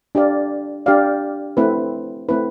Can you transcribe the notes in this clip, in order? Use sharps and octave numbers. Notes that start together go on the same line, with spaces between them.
D4 G4 D5 F5
D4 G4 D5 F5
A3 C4 E4 B4
A3 C4 E4 B4